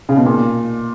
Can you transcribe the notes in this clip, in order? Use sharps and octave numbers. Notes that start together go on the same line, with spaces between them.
C#3
B2
A#2